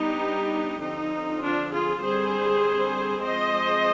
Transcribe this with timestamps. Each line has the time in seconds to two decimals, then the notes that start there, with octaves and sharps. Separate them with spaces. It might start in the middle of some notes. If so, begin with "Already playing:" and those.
Already playing: G3 B3 D4 D#4 G4
0.82 D3 F3 C4 D#4
1.42 D4 F4
1.72 F4 G#4
2.02 D3 G3 C4 G#4 C5
3.23 F3 G#3 C4 C5 D#5